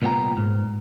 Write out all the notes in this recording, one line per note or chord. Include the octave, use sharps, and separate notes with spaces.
C2 A#2 B3 D#4 G5 A#5
G#2